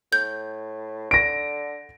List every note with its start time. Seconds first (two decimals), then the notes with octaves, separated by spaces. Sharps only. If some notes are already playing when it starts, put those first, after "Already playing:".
0.12 A2 G6
1.11 D3 A#6 D7